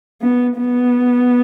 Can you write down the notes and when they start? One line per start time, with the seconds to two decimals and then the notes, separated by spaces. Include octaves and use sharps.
0.22 B3
0.58 B3